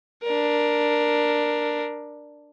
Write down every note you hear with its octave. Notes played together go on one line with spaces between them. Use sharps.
D4 A#4